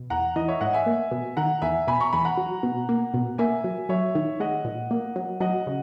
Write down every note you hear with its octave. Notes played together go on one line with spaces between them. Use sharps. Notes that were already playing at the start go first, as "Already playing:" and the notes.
Already playing: B2
E2 F#5 A#5
E3 D#5
C#5 E5
G#2 D#5 F#5
E5 G#5
A#3
B2
D#3 F#5 A#5
E2 E5 G#5
B2 G#5 B5
A#5 C#6
E2 G#5 B5
F#5 A#5
F#3
B2
A#3
B2
A#3 E5 G#5
F#3
F#3 C#5 E5
D#3
G#3 D#5 F#5
A#2
A#3
F#3
F#3 D#5 F#5
C#3